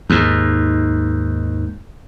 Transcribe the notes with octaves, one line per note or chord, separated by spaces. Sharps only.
D#2 G#2